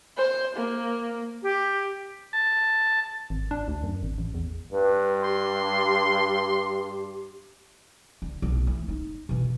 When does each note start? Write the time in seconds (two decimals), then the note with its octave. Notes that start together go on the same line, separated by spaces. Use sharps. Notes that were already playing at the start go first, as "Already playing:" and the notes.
0.18 C5
0.57 A#3
1.43 G4
2.33 A5
3.30 G#1
3.51 D4
3.68 D2
3.83 F#2
4.03 G#1
4.18 A1
4.34 E2
4.72 G2 B4
5.24 G4 C6
8.22 D3
8.42 B1
8.67 E3
8.88 D#4
9.29 B2 E3